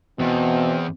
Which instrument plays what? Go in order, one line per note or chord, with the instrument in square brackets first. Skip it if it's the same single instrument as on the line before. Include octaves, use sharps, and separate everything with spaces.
[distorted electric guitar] E2 [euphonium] B2 [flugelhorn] C4